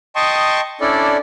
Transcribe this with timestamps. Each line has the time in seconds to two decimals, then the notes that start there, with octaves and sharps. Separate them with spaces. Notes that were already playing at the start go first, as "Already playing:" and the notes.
0.16 D#5 G5 A5 C6 C#6 D#6
0.81 C#4 D4 E4 A4 D5